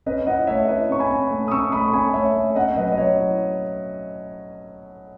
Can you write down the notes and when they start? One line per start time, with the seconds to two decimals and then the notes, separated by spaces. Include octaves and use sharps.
0.06 C#4 B4 D#5
0.26 E4 D#5 F#5
0.47 A3 C#5 E5
0.68 E4 B4 D#5
0.89 C#4 C#6
0.99 G#5 B5
1.10 C#4
1.31 A3
1.48 D#6
1.51 C#4 C#6 E6
1.72 A3 B5 D#6
1.88 C#6
1.94 C#4 G#5 B5
2.14 A3 C#5 E5
2.36 A3
2.55 C#4 D#5 F#5
2.76 F#3 B4 D#5
2.92 D#5
2.98 F#3 C#5
3.18 E4